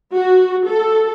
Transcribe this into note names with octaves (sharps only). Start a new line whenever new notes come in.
F#4
A4